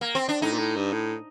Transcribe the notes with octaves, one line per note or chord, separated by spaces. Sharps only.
A#3
C4
D4
A2 D#4
A#2
A2
G2
A2